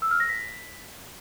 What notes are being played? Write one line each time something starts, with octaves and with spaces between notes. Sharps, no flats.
E6
F6
A#6
B6